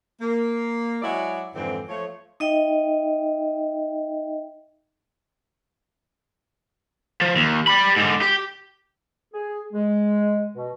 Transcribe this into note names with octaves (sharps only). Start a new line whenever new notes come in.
A#3
F#3 G#3 E4 F#4 C#5 D5
F2 G#2 D3 E3 C4
F3 A3 C#5
D#4 D#5 E5 G5
F3
D#2
G3 B5
G#2 D3
G4
G#4
G#3
B2